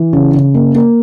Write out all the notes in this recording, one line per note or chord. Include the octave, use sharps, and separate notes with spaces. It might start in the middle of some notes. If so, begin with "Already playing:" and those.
Already playing: E3
C#3
C#3
A#3
A#3